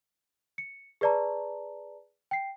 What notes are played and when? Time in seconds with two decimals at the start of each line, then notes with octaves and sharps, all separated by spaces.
0.58 C#7
1.01 G#4 B4 D5 A5 A#5
2.31 G5 C7